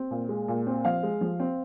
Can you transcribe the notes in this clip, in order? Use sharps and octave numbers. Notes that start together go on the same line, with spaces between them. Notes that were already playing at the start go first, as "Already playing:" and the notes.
Already playing: C4
A#2
G#3
A#2
C4
F3 F5
G#3
F3
C4